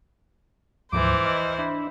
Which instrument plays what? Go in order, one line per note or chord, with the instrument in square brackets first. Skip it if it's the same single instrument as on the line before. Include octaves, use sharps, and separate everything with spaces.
[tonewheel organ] D2 G#2 F3 [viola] E3 C5 [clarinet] D6
[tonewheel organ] D#5 F6
[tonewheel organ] D4 E5 [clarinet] B5